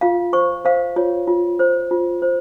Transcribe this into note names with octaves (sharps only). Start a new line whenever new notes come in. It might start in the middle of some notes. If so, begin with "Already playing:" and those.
F4 F5
C5 C#6
C5 F5
F4 C#5
F4
C5
F4
C5